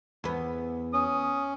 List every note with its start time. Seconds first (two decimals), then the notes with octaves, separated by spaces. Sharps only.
0.24 E2 B3
0.93 C#4 D#6